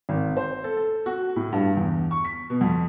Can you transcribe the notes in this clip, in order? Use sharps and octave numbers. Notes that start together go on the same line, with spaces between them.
G#1
C5
A4
A4
F#4
A2
G2
E2
C#6
B6
B2
F2